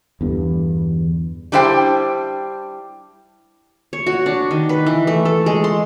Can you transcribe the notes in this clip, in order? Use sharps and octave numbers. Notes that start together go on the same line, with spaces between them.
E2 G2 D3
G3 D4 E4 C5 F5 G5
C#5
F#4
D4
D#3
B4
E3
A3
A4
G#3
C6